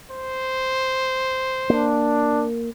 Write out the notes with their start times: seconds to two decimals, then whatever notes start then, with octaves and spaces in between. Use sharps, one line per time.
0.11 C5
1.70 A#3 D4